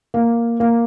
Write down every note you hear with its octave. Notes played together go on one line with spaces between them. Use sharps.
A#3
A#3